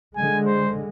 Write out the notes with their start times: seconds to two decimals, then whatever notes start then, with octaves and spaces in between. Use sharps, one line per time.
0.16 D3 G#3 G#5
0.46 C5